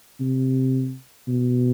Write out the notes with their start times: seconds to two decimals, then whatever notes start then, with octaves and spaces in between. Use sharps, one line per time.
0.20 C3
1.27 B2